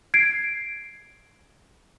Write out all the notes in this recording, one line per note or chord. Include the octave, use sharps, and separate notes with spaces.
G#6 C7 D7